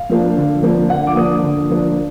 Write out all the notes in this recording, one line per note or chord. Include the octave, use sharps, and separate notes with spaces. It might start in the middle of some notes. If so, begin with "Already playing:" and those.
Already playing: F5
F3 A#3 D4
D3
F3 A#3 D4
D3 F#5
D6
F3 A#3 D4 D#6
D3
F3 A#3 D4